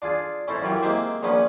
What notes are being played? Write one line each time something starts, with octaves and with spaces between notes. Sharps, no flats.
D4 F4 G#4
C#4 E4 A4 C5 C#5
F#2 E3 F4 G4
G#3 A#3 C4 G4 C5 E5
A#1 A#2 F3 B3 C#4 B4